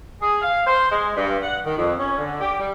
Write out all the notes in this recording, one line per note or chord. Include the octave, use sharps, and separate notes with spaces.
G#4
F5
C5
G#3
G2
F#5
D#3
F2
C#4
D3
G4
G3